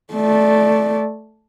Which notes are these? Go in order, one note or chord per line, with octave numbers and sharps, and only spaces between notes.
A3 D5